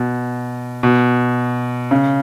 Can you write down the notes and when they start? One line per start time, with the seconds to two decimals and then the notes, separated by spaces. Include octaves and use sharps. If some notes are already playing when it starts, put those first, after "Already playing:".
Already playing: B2
0.83 B2
1.91 C#3